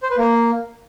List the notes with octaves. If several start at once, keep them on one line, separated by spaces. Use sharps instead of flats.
C5
B4
A#3